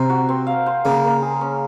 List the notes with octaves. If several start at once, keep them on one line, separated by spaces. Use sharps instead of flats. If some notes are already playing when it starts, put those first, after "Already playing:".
Already playing: C3 C4 A#4 C5
F#4
C4
F5
C5
C#3 A#3
A#3
G#4
C#4